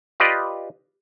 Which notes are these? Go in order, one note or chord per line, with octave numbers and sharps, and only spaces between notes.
F4 G4 B4 D5 D#5